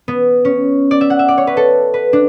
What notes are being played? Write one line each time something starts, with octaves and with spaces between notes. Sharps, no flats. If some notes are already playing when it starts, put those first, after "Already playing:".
B3
C#4
D5
E5
F#5
E5
D5
C#5
B4
A4
B4
D4